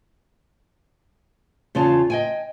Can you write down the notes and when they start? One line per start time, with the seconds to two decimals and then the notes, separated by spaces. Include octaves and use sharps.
1.75 E2 C#3 F4 G#4 A5
2.10 D#5 G5 G#5